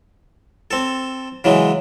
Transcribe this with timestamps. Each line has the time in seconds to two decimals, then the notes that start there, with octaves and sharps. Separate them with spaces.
0.71 C4 A4
1.44 C#3 E3 F#3 G#3